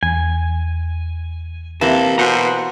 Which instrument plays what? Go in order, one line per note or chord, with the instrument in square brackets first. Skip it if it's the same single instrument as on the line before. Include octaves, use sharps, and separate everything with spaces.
[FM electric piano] E2 [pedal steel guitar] G#5
[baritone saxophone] C3 [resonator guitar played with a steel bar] E3 A#3 [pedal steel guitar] A5
[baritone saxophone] B2 [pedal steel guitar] C5 F#5 A#5